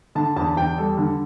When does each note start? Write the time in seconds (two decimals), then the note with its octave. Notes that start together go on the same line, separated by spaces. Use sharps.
0.15 D3 A5
0.36 E2 A5
0.57 E2 G5
0.78 G3 A4
0.98 D3